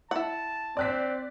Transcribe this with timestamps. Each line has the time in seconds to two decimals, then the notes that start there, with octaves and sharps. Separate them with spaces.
0.11 E4 F#5 A5
0.77 C4 D5 F#6 B6